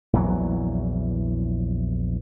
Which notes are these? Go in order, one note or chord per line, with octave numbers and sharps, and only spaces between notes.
A#1 E2 E3 F#3